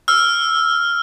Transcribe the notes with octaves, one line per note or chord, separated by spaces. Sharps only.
E6 F6